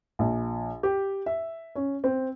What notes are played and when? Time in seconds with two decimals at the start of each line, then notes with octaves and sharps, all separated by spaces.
0.19 A#1
0.83 G4
1.26 E5
1.75 C#4
2.04 C4